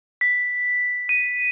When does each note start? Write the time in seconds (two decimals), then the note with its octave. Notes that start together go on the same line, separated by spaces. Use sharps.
0.21 B6
1.09 D#7